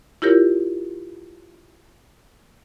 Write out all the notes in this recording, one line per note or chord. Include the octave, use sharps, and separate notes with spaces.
E4 F4 G4 A#4 C#5